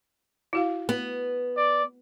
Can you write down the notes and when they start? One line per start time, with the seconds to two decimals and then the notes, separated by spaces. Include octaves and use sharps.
0.53 E4 F#4 F5
0.89 B3
1.57 D5